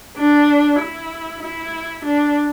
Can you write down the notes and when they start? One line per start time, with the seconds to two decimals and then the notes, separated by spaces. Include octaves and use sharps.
0.17 D4
0.80 E4
1.42 E4
2.05 D4